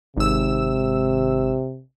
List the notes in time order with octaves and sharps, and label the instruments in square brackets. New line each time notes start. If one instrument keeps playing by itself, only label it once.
[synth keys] G#1 E6 [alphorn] C3